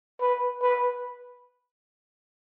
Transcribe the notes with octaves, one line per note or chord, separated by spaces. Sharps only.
B4
B4